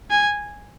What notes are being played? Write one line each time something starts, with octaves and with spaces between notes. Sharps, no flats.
G#5